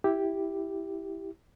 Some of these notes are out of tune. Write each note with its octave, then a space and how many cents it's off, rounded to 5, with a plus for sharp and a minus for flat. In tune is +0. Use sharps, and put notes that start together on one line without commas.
E4 +0 G4 +0